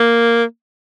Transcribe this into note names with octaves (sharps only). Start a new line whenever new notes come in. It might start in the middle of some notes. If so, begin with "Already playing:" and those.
Already playing: A#3